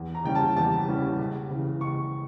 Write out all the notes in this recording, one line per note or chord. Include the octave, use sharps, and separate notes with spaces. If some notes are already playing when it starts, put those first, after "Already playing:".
Already playing: E2
A#5
C#3 E3 G3 C#4 G5
A5
E2 A5
C#3 E3 G3 C#4
C#2
C#3 E3
C#2 C#6